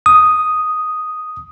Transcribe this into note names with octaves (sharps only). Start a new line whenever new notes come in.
D#6